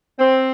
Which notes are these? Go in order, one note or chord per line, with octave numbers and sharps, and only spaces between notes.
C4